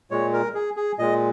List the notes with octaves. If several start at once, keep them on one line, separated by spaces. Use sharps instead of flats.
A#2 G#3 C#5
A#4
G#4
G#4
A#2 G#3 D#5